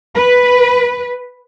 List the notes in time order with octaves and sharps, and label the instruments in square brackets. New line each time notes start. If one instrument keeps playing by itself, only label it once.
[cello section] B4